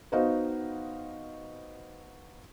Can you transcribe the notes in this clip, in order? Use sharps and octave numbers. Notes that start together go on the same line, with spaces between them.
B3 D#4 F#4 C5 D#5 F5